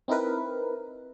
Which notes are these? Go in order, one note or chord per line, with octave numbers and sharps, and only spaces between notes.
C4 D#4 E4 A#4 B4